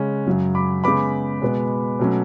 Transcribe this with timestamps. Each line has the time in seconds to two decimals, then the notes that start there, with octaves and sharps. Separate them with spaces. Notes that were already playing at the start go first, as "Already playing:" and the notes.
Already playing: C#3 G#3 C#4
0.26 F#2 C#3 F#3
0.55 B5 D6
0.84 C#3 G#3 B3 B5 D6
1.42 B2 G#3 B3
1.99 B2 F#3 A3 C#4